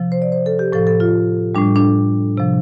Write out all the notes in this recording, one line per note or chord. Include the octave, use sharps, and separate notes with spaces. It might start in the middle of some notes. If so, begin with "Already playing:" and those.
Already playing: C3 F3
C5
D5
C5
A4
G4
A2 F3 A4
A4
F4
A2 G3 D4
D4
C3 F3